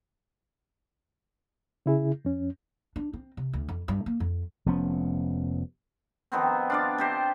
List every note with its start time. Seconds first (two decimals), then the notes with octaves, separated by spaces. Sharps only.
1.86 C#3 E4 G#4
2.25 F2 C#4
2.96 D4
3.13 C4
3.37 C3
3.54 D2
3.69 F2
3.88 G2
4.06 A#3
4.20 F2
4.66 F1 F3 B3 C#4
6.32 D#3 F3 B3 C4
6.70 D4 F4 D5
6.98 C3 G4 C5